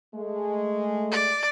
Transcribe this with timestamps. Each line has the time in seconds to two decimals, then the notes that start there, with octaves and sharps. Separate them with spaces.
0.15 G#3 A3
1.11 D5